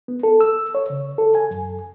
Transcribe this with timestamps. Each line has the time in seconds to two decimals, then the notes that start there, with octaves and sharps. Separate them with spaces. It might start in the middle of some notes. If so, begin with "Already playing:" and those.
0.08 B3
0.23 A4
0.41 E6
0.75 C#5
0.90 C#3
1.18 A4
1.35 G#5
1.51 F#2